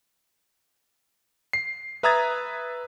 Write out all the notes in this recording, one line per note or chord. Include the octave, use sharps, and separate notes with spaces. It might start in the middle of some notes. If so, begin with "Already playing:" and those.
C7
B4 E5 A#5 D#6 G#6 A6